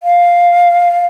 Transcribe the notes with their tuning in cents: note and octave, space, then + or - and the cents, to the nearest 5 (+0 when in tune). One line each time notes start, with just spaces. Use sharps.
F5 +0